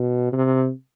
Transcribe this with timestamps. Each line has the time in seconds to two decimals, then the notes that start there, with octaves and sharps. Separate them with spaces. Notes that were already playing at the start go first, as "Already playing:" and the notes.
Already playing: B2
0.33 C3